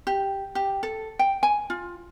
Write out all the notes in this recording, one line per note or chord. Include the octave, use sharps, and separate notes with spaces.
G4
G4
A4
G5
G#5
F4